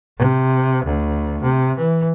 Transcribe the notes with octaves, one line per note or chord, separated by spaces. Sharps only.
C3
D2
C3
E3